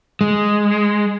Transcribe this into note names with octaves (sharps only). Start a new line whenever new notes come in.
G#3